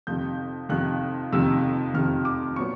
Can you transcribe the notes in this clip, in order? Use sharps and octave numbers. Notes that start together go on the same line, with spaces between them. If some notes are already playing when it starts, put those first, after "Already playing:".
F2 C3 D#3 G6
F2 C3 D#3 F#6
F2 C3 D#3 E6
F2 C3 D#3 F6
D6
A#2 F#3 B3 C#6